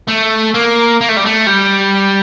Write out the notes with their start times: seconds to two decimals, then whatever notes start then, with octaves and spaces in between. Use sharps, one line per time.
0.08 A3
0.54 A#3
1.01 A#3
1.09 A3
1.16 G3
1.25 A3
1.46 G3